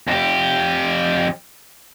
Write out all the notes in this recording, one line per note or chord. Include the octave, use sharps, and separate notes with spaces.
F2 G4